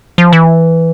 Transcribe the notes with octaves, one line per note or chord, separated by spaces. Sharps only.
F3
E3